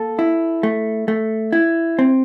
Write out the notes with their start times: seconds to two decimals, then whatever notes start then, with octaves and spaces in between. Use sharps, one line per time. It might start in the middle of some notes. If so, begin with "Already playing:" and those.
Already playing: A#3 A4
0.19 E4
0.63 A3
1.08 A3
1.53 E4
1.99 C4